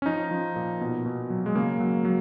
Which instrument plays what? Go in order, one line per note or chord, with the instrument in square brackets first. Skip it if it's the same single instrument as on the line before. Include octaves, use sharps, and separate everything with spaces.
[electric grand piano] C#4
F3 D#4
F3
A#2
B2
B2
F#3
G#3
C#3 A#3
F#3
F#3